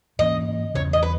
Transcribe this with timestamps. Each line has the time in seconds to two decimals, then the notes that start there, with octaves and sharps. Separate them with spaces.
0.19 G#2 E3 A#3 C#4 D#5
0.74 E2 C#3 E3 C#5
0.93 D#5
1.03 B4